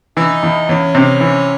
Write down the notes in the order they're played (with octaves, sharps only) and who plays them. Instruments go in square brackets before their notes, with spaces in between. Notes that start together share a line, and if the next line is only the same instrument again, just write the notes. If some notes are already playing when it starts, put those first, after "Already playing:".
[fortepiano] E3 [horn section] D#4
[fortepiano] E2
[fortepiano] E2 [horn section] C#4
[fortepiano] C3
E3